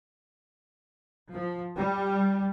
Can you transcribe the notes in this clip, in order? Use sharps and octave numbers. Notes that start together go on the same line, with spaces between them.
F3
G3